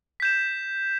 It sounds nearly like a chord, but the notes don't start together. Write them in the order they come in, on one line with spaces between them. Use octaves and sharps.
B6 G6 E7